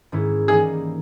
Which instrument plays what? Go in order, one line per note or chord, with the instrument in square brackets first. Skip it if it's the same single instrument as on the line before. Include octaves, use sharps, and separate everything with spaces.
[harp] G#2 D#3 G#3 C#4 E4
[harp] E3 G3 A#3 D#4 [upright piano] G#4